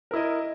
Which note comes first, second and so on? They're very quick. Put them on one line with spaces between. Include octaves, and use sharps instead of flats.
A#4 E4 D#5